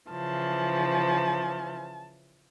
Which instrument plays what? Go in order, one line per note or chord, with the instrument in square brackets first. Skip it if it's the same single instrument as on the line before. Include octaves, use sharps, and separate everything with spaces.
[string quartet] C#3 E3 F3 [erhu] A5